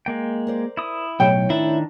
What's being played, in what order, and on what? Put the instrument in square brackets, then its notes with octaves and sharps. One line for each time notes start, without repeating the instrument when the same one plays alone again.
[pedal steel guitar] G#3 A#3 G5
[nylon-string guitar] A#4 C5 D5
[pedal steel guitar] E4 D#6
[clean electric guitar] B1 [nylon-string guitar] A2 C#5 [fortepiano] G5
[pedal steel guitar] D#3 D4 [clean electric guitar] E4